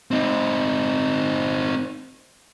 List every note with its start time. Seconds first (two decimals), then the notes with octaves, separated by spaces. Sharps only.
0.11 C4 D#4